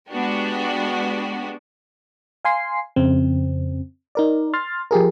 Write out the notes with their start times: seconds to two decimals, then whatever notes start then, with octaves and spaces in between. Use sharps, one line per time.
0.11 G#3 B3 D4 F#4 G4
2.45 F5 G#5 C6 C7
2.96 F2 C#3 C4
4.15 D#4 A#4 D5
4.53 C6 F6 A6
4.91 F3 G4 G#4 A#4